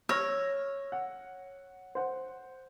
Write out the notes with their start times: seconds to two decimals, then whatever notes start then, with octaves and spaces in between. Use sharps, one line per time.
0.09 C#5 E6 F6 A#6
0.92 F#5
1.95 C5 F#5